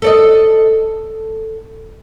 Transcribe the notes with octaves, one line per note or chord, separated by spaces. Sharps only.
A4 D5 D#5